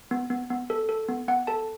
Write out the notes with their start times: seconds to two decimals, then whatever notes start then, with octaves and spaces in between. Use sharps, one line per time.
0.11 B3
0.30 B3
0.50 B3
0.70 A4
0.89 A4
1.09 B3
1.28 B3 F#5
1.47 A4 A5